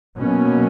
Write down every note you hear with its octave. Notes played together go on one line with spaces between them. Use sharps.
B2 F#3 A#3 C#4